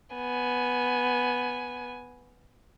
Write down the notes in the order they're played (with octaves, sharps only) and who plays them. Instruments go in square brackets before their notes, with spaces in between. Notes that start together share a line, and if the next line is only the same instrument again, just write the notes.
[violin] B3 G#5